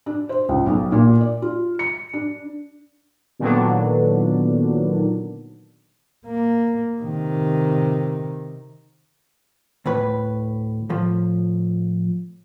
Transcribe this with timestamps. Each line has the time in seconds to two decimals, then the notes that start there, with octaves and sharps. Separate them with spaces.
0.06 D4
0.29 C5
0.49 C#2
0.66 B1
0.92 A#2
1.21 D5
1.42 F4
1.79 C#7
2.13 D4
3.39 A#2 D3 D#3 F#3 B3 D4
6.26 A#3
7.00 C3 D#3
9.86 D2 A2 B4
10.90 A2 F3